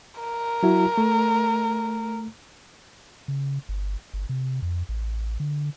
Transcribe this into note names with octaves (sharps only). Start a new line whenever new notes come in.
A#4
F#3 E4 F#4
A3
C#3
G1
G1
C3
F2
A1
D3